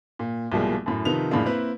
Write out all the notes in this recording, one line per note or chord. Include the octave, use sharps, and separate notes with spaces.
A#2
C2 B2 F3 G3 G#3 A#3
F#2 A2
C3 D#3 F3 D#4 B4 F7
F2 A2 C#3 G#3 A#3 D4
A#3 C4 E4 B4